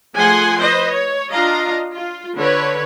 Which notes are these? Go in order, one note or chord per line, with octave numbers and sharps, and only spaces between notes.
F3 A3 G#4 F#5 G#5 C6
B4 C5 D#5
C#5
D4 F4 D#5 F5 A#5
F4
D3 B4 C#5